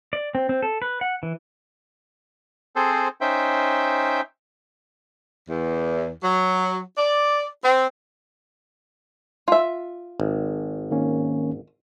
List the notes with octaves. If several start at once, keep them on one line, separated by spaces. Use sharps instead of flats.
D5
C4
C4
A4
B4
F#5
E3
C4 G#4 A4 C5
C#4 D#4 C5 E5 G5
E2
F#3
D5
C4
F4 E5
G#1
D#3 A#3 C#4